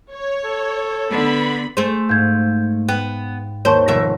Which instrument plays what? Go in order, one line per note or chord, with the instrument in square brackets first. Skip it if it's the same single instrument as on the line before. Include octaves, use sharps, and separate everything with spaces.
[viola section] C#5
[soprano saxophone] A4
[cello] D3 [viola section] B3 B5
[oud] A3 G#4 C5
[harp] G#2 F5 [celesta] G6 G#6
[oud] B3 [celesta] G5
[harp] D#2 [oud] C5 [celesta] C#5 A5 C#6
[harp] F1 [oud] B2 D#3 E5